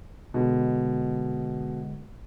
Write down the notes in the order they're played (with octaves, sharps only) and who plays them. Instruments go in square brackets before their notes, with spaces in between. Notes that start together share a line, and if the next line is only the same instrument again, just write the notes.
[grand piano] B2 [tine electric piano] D3 G#3